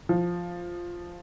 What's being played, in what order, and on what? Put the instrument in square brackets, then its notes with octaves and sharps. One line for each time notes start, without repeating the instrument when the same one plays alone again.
[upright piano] F3